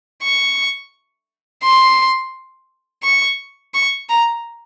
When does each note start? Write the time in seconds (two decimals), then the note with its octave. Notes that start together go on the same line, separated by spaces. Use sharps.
0.22 C#6
1.63 C6
3.03 C#6
3.74 C#6
4.09 A#5